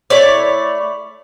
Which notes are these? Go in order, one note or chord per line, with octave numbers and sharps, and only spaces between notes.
A3 E4 C#5 D5